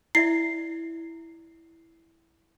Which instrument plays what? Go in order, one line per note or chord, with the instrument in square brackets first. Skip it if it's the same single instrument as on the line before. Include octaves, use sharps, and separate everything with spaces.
[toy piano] E4 D5 E5 [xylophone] C7